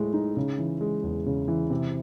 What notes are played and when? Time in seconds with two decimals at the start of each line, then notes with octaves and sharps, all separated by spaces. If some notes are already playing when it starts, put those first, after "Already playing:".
Already playing: A2 G#3
0.13 D#4
0.37 C#3
0.58 E3
0.81 G#3
1.03 E2
1.26 C#3
1.48 E3
1.70 C3